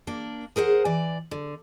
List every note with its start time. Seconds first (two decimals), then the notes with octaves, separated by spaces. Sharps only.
0.07 A#3 D4
0.56 G#4 A#4 C5 F#5
0.85 E3 D5
1.31 D3